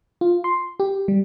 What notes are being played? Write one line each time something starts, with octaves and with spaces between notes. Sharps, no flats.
F4
C6
G4
G3